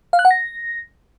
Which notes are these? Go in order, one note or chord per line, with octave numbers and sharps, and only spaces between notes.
F5
F#6
F#5
A#6